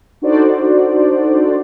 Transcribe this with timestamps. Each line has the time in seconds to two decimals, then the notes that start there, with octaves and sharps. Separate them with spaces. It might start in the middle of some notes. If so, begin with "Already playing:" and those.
0.22 D4 D#4 F#4 A4 C5 D5